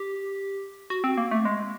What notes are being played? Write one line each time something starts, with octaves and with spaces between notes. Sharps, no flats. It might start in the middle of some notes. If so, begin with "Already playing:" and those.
Already playing: G4
F#4
C4
A#3
A3
G#3